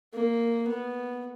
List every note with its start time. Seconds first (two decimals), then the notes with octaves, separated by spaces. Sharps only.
0.14 A#3
0.68 B3